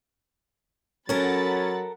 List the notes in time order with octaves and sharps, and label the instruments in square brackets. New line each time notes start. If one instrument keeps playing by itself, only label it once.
[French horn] F#3 [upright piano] C#4 [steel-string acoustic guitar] A4 A#4 [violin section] F#5 B5 A6